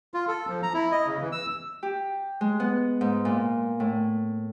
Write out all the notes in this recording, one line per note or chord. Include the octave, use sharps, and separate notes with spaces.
F4
A4
F3
A#5
E4
D#5
C#3
E3
E6
G4
G#3
B3
G#2
A#2
A2